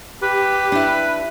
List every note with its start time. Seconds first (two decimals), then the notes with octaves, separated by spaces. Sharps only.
0.23 G4 B4
0.72 D4 E4